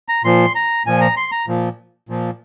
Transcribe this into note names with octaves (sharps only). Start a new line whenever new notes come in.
A#5
A#2 F3 C6
A#5
A#2 F3 G#5
A#5
C6
A#5
A#2 F3
A#2 F3